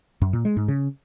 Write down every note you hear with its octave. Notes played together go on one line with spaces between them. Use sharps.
F#2
A#2
G#3
G#2
C#3